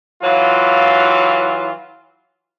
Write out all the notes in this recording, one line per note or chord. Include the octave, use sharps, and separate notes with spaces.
E3 F#3 F4